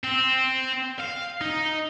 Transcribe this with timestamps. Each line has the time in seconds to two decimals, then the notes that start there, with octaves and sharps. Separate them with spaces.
0.04 C4
1.00 F5
1.41 D#4